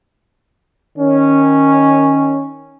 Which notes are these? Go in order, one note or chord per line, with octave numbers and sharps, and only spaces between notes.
D#3 C#4